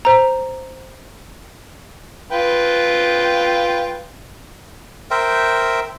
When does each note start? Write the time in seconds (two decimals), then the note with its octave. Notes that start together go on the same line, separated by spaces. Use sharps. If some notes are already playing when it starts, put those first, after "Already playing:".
0.05 C5 A#5
2.32 F4 B4 G5
5.11 A#4 C5 E5 G5